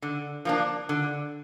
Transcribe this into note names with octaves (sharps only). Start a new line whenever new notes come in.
D3
F3 A#3 D4
D3